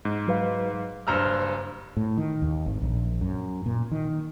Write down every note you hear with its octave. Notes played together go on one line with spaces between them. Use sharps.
G#2
F#3 B4 F5
F#1 G2 C5 A#5 E6 F6
A2
D#3
D#2
G#1
A#1
F#2
A#2
D#3